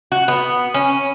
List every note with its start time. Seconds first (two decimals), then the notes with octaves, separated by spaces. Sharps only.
0.12 F#4
0.28 B3
0.74 C#4